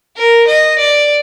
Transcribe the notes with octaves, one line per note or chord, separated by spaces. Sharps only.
A#4
D#5
D5